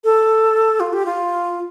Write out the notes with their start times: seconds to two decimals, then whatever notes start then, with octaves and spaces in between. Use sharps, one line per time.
0.04 A4
0.80 F4
0.93 G4
1.06 F4